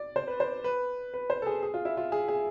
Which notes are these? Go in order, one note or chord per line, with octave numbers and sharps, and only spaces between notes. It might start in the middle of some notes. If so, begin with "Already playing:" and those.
Already playing: D5
C5
B4
C5
B4
B4
C5
A4
G#4
G#4
F4
E4
F4
G#4
G#4